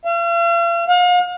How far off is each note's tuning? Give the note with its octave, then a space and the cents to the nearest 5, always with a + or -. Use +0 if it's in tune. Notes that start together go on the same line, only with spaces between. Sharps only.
F5 -45
F5 +40